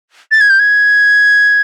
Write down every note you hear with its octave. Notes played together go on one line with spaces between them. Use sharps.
A6
G#6
G6
G#6